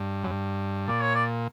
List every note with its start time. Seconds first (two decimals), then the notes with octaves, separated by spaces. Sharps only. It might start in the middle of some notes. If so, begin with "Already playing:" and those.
Already playing: G2
0.24 F#2
0.31 G2
0.88 A#2 D5
1.01 C#5
1.15 D5